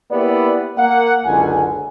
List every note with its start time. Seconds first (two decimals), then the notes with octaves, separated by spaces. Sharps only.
0.11 A#3 B3 E4 G4 D5
0.78 A#3 F#5
1.26 F#1 C#2 D3 F#5 G#5